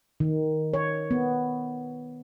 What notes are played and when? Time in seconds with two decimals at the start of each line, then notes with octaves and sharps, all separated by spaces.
0.20 D#3
0.74 C#5
1.11 B3